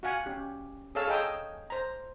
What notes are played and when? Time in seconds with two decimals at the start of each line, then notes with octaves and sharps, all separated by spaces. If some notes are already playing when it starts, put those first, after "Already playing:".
0.03 F#4 F5 F#5 G#5
0.26 C#4 G4
0.95 G#4 A4 C#5 F5 A5 E6
1.08 G#4 A4 D#5 G5 A#5 E6
1.70 C5 A#5